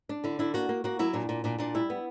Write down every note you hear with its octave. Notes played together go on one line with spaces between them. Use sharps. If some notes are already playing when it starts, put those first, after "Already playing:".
D4
D3 E4
D4 E4
A#3 F#4
A#3
A#3 F#4
F#3 E4
A#2 D4
A#2
A#2 D4
A#2 D4
G3 E4
B3